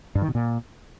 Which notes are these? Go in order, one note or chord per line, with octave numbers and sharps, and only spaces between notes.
G2
D#3
B2
A#2